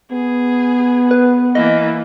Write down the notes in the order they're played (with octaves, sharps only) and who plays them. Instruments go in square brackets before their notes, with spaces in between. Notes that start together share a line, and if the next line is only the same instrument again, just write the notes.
[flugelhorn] B3 [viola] G#4
[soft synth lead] B4
[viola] E3 A#3 [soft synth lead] D#5